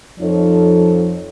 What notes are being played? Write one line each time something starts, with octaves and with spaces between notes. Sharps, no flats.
F2 F3 D#4 A4 C#5